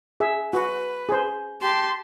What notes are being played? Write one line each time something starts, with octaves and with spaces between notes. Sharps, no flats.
G#4 E5
F#4 B4
G#4 C5
G4 A5 C6